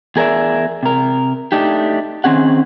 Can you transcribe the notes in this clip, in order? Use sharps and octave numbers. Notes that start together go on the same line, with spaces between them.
E2 G#4 A#4 D5 E5
C3 A#4
A3 D4 D#4 G4
D#3 C4 C#4 G#4 F#5